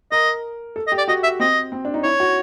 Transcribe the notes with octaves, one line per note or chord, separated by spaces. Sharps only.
A#4 D#5
A4
D#5
G4
D5
F#4 D#5
E5
C4 D#5
C4
D4
D#4
E4 C#5
F#4